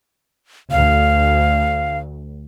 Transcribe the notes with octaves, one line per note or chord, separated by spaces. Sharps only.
D2 F5